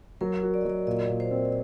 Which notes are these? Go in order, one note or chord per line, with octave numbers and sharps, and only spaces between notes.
F#3 A#4
F#4
D5
D#5
F#3 D5
A#2 D#5
A#2
C5
C4